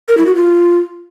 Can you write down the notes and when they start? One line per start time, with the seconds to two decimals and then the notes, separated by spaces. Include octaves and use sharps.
0.09 A#4
0.17 E4
0.26 F#4
0.35 F4